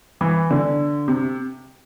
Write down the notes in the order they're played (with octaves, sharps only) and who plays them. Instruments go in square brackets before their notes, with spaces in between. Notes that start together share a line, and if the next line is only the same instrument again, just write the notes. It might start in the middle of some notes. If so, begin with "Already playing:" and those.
[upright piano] E3
D3
C3